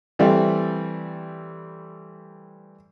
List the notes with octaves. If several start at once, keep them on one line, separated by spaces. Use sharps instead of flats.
E3 G3 A3 C4 E5